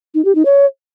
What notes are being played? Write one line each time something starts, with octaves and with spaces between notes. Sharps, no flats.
D#4
G4
D#4
C#5